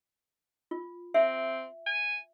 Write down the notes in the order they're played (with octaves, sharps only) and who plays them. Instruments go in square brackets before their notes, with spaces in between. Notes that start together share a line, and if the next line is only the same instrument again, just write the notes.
[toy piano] F4
[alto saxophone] C4 [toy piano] E5
[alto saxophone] G#5